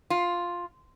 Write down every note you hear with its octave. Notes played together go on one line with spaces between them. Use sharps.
F4